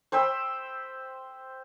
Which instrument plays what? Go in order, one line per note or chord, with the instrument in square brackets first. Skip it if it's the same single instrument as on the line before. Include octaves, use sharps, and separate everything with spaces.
[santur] C5 G5 B5 E6